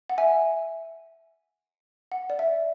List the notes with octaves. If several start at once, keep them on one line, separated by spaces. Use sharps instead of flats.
F#5
E5 G#5
F#5
D5
E5